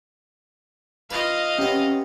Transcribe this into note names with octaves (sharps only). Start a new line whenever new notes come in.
F4 B4 D#5 F5
C3 B3 C#4